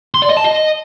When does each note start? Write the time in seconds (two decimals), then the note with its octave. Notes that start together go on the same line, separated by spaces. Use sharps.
0.14 C6
0.22 D5
0.29 D#5
0.37 A5
0.44 D#5